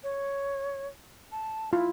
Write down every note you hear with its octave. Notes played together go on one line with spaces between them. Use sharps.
C#5
A5
E4 F4